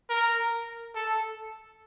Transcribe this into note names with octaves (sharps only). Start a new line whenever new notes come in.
A#4
A4